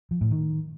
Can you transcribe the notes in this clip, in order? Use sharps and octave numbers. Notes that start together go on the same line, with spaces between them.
F3
A2
D#3